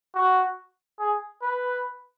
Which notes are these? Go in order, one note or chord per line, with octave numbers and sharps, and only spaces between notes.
F#4
G#4
B4